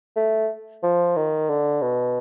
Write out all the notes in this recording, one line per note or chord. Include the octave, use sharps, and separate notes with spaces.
A3
F3
D#3
D3
B2